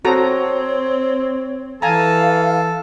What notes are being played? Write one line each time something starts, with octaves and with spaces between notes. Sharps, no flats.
C4 F#4 A4 C#5 A#5
E3 A4 F5 G#5 A#5